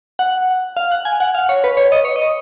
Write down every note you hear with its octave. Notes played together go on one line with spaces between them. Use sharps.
F#5
F5
F#5
G#5
F#5
F5
C#5
B4
C#5
D#5
C#5
D#5